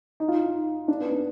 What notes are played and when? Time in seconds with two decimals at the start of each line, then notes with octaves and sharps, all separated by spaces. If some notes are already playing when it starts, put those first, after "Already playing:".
0.20 D#4
0.28 F4
0.46 D#4
0.88 D4
1.00 B3
1.12 D4